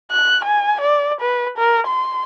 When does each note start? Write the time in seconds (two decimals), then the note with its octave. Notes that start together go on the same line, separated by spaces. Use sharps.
0.11 F#6
0.45 G#5
0.81 D5
1.21 B4
1.58 A#4
1.87 C6